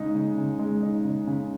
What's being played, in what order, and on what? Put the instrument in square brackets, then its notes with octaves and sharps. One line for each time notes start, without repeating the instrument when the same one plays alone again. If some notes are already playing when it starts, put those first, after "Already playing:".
Already playing: [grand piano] C#3 G#3 D#4
C#3
C#3
G#3
D#4
C#3
C#3